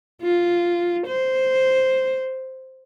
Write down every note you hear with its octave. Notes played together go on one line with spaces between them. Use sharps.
F4
C5